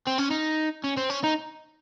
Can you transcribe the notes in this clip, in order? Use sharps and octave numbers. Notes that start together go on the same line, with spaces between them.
C4
C#4
D#4
C#4
C4
C#4
D#4